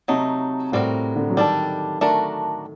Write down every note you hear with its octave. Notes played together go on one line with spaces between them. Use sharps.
C3 F#3 A3 D#4
A2 G3 C4 F#4 A#4
D3
F#3
D#3 G3 D4 A4
A3 D4 F#4 A#4